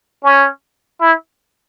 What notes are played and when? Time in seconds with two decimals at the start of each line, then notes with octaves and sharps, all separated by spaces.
0.24 C#4
1.01 E4